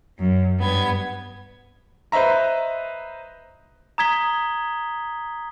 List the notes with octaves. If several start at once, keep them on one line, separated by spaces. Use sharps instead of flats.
F#2
G2 B3 G#6
B4 C5 D#5 E5 A#5
A#5 D#6 G#6 B6 G7